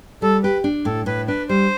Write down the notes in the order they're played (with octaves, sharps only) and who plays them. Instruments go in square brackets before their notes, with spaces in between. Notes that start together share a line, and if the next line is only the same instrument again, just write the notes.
[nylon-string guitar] G3 [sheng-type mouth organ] A4
[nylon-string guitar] G4 [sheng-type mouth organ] B4
[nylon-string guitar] D4
[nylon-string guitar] A2 [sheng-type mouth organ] A4
[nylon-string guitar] A2 [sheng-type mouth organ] B4
[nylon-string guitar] D4 [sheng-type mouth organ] B4
[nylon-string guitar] G3 [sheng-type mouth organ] C5